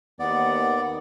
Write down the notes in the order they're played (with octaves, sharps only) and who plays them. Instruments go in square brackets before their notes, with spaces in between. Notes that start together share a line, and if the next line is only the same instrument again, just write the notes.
[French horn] D#2 [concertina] B3 D5 [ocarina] F#5